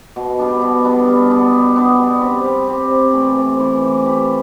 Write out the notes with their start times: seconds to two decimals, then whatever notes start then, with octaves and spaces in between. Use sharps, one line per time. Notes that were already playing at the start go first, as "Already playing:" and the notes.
0.16 B2
0.39 G3 B3 D4
0.62 B2
0.84 G3 B3 D4
1.08 G3
1.30 B3 D4
1.53 G3
1.76 B3 D4
1.99 G3
2.21 C4 G4
2.44 G3
2.67 C4 G4
2.90 C3
3.13 E3 A3 E4
3.36 C3
3.59 E3 A3 E4
3.81 E3
4.04 A3 E4 G4